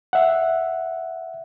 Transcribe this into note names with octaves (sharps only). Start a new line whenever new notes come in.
E5 F#5